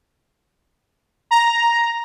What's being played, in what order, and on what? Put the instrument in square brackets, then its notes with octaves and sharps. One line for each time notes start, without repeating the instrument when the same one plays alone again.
[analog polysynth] A#5